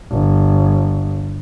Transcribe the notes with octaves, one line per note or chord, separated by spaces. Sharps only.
G1